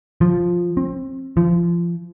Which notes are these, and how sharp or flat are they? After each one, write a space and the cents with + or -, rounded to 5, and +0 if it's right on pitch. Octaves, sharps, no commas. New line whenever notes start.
F3 +5
C4 +30
F3 -25